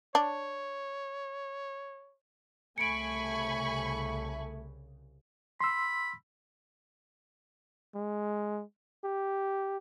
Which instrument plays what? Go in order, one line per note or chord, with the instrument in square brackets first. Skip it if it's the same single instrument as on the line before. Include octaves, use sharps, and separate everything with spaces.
[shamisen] D4 [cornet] C#5
[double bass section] C2 C#3 [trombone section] A3 [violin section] G#5 B5 C#6 [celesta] C#7 D7
[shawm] B5 [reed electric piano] C6 E6
[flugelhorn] G#3
G4